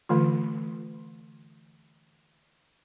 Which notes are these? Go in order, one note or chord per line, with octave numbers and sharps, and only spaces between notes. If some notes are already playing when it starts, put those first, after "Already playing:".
D3 E3 A3 F4